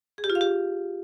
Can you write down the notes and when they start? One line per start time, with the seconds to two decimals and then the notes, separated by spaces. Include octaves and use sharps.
0.18 G#4
0.24 G4
0.30 F4
0.35 F5
0.41 G4